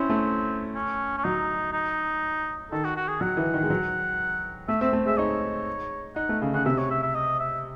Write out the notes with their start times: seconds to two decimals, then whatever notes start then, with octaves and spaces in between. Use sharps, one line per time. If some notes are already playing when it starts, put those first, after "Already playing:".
Already playing: C4 C#4 E4
0.10 A3
0.75 C#4
1.18 C#4
1.24 F#3 D#4
1.73 D#4
2.72 D#3 A4
2.84 F#4
2.96 F#4
3.08 G#4
3.21 F#3 F#5
3.37 E3
3.54 D#3
3.63 G#3
3.70 F#3
4.68 A3 E5
4.81 C4 E5
4.93 A3
5.06 G#3 E5
5.17 D#4 C#5
6.16 D#4 F#5
6.29 A3
6.42 C#3
6.54 C#3 F#5
6.66 C3 E5
6.78 C#5
6.91 E5
7.03 E5
7.15 D#5
7.40 E5